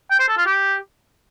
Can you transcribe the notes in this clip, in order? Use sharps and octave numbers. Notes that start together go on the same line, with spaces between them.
G5
C5
A4
F4
G4